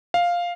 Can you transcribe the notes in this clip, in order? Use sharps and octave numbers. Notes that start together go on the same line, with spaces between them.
F5